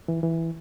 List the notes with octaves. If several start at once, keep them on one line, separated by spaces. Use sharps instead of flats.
E3
E3